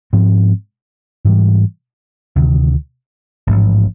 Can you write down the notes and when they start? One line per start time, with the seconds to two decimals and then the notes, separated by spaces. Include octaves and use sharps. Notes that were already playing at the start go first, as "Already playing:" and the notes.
0.13 G#2 F3 G#3 C4
1.25 G#2 E3 G3
2.36 D2 C3 D#3
3.47 A1 G#2 F3